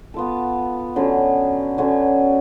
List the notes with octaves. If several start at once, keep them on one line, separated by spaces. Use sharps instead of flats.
B3 F4 A4
D3 F#3 C#4
D3 F#3 C#4